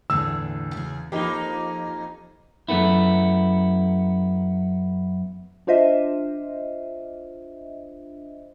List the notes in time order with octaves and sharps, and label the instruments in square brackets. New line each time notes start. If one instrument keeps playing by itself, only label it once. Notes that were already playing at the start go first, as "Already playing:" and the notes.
[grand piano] E2 [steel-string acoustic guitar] A2 D3 G#4 [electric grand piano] E6
[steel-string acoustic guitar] C#3 G#4
[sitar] F2 A#3 D#4 [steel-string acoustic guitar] F3 [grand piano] G4 B5 G7
[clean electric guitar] F#2 A3 B3 E4
[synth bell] D4 F4 C5 D#5 E5